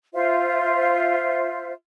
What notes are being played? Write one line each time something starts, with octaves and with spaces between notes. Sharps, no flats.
F4 C5 E5